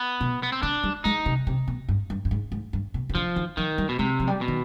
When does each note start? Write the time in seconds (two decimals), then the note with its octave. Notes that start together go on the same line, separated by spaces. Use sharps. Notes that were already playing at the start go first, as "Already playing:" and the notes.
Already playing: B3
0.21 B2
0.43 B3
0.52 C4
0.62 D3 D4
0.83 G3
1.04 G#3 D#4
1.26 C3
1.47 C3
1.68 B2
1.88 G2
2.10 G2
2.25 G2
2.31 G#2
2.52 G#2
2.73 G2
2.94 B2
3.09 C3
3.15 D3 F3
3.36 D#3
3.57 D#3 F3
3.78 G3
3.89 B2
3.99 C3 G#3
4.19 F3
4.27 G3
4.41 B2
4.48 D#3